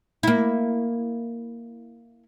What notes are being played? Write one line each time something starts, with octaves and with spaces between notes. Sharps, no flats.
A#3 E4